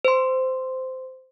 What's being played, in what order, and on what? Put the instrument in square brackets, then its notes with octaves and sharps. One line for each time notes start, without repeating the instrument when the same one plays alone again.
[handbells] C5 C6